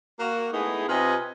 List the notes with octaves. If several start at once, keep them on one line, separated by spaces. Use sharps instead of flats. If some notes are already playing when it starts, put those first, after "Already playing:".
A#3 F#4
G#3 A3 B3 D#4 E4 G#4
C3 C4 F4 B4 D#5 G#5